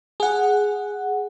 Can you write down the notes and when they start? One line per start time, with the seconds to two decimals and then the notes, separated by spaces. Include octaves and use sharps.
0.20 G#4 F#5